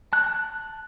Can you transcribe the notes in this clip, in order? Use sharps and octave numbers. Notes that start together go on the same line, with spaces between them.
A5 F#6